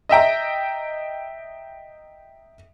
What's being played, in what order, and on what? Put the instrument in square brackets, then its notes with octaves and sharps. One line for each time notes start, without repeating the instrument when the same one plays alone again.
[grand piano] D#5 E5 G5 A#5